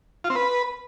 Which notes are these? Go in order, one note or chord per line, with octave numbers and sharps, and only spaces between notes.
F4
C4
B4